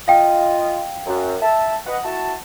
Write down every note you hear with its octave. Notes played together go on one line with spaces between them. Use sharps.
F4 D#5 F5 G5
F#2
E5 A5
B4 D#5 F#5
E4 F#4 A5